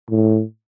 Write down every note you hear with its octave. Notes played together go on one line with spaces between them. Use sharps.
A2